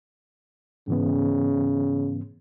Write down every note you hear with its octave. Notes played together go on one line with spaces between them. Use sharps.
G#2 C#3 E3 B3